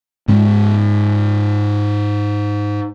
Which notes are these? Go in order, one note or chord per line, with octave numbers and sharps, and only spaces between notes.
G#2 G#3 C#4